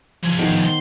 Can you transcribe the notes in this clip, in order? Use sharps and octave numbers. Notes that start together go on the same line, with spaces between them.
F3 G#4
D#3 B3 C5
C6